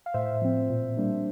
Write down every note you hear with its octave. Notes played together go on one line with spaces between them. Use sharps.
F5
A2 C5 E5
F3 C4
A#2
G3 A#3 D4